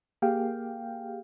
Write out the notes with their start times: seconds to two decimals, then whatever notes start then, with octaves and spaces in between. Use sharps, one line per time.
0.22 A#3 G4 G#4 F5 G5